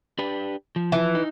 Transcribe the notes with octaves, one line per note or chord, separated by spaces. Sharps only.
D4 G4 B4
F3
E3
D#4